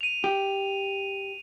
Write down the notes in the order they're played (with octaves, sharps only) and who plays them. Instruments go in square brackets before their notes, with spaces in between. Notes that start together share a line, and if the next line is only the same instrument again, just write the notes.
[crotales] D#7 F7
[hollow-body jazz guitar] G4